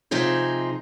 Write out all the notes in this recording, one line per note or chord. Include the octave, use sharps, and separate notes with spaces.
C3 F3 C4 D#4 G#4